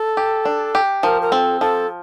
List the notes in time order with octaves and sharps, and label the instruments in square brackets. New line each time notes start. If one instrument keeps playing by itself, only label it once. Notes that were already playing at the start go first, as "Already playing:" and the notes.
Already playing: [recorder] A4
[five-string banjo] G4
D4
G4
[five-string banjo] F3 [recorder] A#4
[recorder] A#4
[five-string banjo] C4 [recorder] A4
[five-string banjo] F3 [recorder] A4